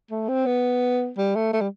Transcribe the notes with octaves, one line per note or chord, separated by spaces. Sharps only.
A3
C4
B3
G3
A3
A3
G3